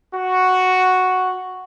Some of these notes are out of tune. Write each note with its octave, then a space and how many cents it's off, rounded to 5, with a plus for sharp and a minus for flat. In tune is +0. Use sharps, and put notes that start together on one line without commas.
F#4 +0